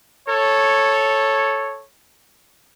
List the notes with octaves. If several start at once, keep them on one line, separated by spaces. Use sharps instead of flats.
A4 C#5